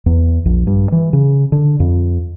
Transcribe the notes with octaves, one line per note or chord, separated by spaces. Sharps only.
E2
A#1
G2
E3
C#3
D3
F2